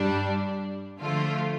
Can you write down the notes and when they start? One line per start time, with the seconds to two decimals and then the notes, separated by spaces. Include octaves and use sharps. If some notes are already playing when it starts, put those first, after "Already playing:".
Already playing: G2 G3 D4
0.99 D3 F3 A3 F4